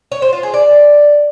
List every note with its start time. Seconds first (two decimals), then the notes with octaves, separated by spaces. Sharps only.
0.12 C#5
0.22 C5
0.33 F4
0.43 G#4
0.54 D5